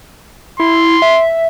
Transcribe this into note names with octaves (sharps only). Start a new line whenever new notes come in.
E4 C6
E5